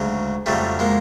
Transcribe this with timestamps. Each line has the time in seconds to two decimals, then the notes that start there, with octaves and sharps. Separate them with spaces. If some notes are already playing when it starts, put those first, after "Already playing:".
Already playing: D2 C#3 F#3 G#3
0.46 F2 C#3 F#3 G3 A3
0.79 G#3 A#3